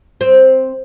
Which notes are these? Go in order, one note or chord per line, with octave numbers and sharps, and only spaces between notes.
C4